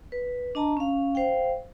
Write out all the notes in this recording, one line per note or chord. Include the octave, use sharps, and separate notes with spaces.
B4
D4 D#5 A5 A#5
C#4 F5
C5 F5 G5